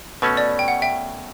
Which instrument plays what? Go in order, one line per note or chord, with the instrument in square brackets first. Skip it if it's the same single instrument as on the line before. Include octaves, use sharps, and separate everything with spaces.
[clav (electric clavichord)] B2 A3 C#4 [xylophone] B4
[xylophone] D5
G5
F#5
E5 G5